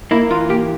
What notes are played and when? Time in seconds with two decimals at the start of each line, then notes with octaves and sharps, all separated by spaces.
0.11 A#3 E4
0.30 E3 F4
0.49 A#3 G4